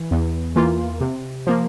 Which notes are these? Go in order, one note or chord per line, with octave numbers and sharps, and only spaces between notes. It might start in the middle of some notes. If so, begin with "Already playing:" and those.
Already playing: E3
E2
E3 A#3 F4
C3
F3 A#3